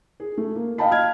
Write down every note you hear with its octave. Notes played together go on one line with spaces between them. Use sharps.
G#4
A3
A#3
D#5 F5 G5 A5 B5
F5 F6 G#6